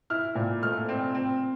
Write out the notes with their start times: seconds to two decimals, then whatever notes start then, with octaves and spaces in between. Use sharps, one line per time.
0.10 E4 F6
0.35 A#2
0.62 A3 F6
0.89 C4
1.15 C4